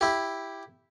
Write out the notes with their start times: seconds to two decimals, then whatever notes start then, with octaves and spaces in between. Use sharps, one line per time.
0.01 E4 G4